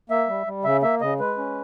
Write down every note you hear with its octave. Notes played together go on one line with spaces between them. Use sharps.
A#3 E5
G3
G3
C#3 E5
A#3 E5
C#3 D#5
G#3 B4
C#4